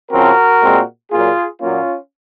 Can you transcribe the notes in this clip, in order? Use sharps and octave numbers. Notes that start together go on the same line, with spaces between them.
C#3 F3 C4 F#4 A#4
A#2 G#3 C4
A#2 F#3 A#3 F4 G#4
A#2 F#3 A#3 C#4 F4